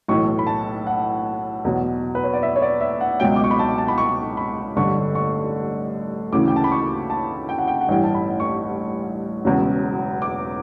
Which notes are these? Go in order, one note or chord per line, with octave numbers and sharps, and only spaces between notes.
B1 A2 E3 C#6
B5
A5
F#5
E2 B2 F#3
B4
C#5
D5
E5
C#5
D5
E5
F#5
C#2 B2 F#3 G5
D6
C#6
B5
A5
A5
B5
C#6
B5
A1 G2 D3 C#6
C#6
D2 C#3 E3 D6
G5
A5
B5
C#6
A5
G5
F#5
G5
F#5
A1 G2 E3 G5
A5
B5
C#6
E1 E2 C#3 F#3
D6